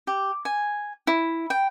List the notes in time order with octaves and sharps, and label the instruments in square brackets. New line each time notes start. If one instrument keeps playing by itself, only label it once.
[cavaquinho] G4
G#5
E4
G5